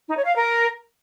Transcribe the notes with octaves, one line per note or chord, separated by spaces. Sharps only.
D#4
C#5
F5
A#4